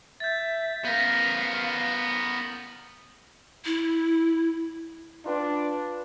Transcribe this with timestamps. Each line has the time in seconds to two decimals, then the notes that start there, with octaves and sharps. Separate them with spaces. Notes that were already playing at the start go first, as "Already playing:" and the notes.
0.20 E5 G6 A6
0.85 B3 A#4 F5 G6 A#6 B6
3.65 E4
5.26 D4 F4 B4 G5